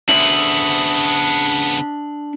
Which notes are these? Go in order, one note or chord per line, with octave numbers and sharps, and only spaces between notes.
C#3 B3 D4 E5 F#7